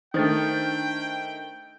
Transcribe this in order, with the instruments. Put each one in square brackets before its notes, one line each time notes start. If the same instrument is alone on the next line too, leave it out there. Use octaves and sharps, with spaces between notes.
[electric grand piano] D#3 A3 [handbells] D4 C5 A6 [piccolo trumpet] G5